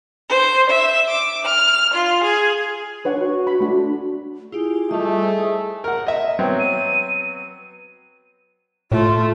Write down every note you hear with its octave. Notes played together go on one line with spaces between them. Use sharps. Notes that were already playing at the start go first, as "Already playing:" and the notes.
C5
E5
D6
F6
F4
G#4
D4 B4 C#5 F#5
F#4
B5
A3 D4 F#4
E4 F4 G4 G#4
G3 A3 F4 D#5
C5
A#4 F#5
D#5 E5
F#3 B3 C4
D#7
A2 A3 F4